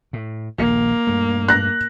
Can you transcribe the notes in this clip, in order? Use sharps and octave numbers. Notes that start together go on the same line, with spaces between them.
A2
D#1 A#1 A#3
G2 A3
F#6 A#6